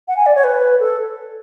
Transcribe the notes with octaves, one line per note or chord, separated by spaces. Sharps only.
F#5
G#5
D5
C#5
B4
A4